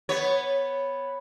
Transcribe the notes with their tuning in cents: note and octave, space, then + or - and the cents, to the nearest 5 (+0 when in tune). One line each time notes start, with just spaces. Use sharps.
B3 +0 C#5 -10